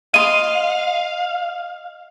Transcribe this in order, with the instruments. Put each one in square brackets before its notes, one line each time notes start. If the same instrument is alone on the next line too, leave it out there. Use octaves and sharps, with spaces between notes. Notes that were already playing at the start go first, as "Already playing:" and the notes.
[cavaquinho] D#5 C6 [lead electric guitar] F5 [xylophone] D#7